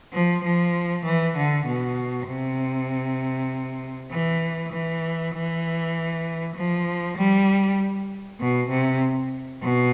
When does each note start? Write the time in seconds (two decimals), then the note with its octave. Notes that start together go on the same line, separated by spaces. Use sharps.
0.13 F3
0.44 F3
1.05 E3
1.37 D3
1.67 B2
2.27 C3
4.11 E3
4.72 E3
5.34 E3
6.56 F3
7.17 G3
8.40 B2
8.70 C3
9.62 B2